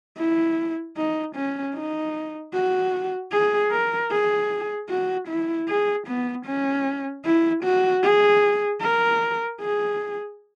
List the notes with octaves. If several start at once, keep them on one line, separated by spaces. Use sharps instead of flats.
E4
D#4
C#4
D#4
F#4
G#4
A#4
G#4
F#4
E4
G#4
B3
C#4
E4
F#4
G#4
A#4
G#4